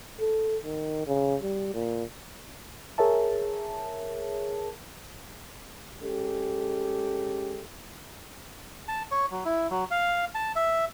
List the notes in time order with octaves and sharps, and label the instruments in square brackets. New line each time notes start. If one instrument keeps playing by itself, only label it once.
[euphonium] A4
D#3
C#3
G3
A#2
[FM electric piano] G#4 A#4 C#5 E5 A5
[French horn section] G#3 C#4 G4 A4
[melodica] A5
C#5
F#3
E4
F#3
F5
A5
E5